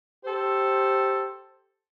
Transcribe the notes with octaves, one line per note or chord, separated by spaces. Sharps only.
G4 A4 C5